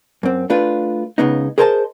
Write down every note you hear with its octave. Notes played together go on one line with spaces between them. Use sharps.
F#2 C4
A3 D4 F4 B4
C#2 C#3 B3 D#4
G#4 A#4 C5 D#5 G#5 A5